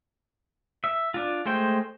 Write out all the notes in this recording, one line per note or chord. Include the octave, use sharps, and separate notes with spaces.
E5
D4 F4
G#3 A3 C5 G5